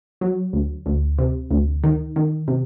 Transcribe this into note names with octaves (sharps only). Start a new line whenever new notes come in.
F#3
D2
D2
C3
D2
D#3
D#3
C3